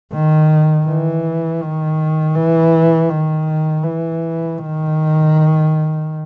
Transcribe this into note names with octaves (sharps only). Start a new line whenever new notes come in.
D#3
E3
D#3
E3
D#3
E3
D#3